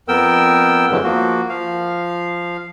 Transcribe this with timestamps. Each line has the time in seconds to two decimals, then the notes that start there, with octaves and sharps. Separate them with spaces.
0.08 F2 B3 A#4 G5 E6
0.91 G2 D3 E3 F#3 G#3
1.04 F3 A#3 F#4
1.49 F3 F5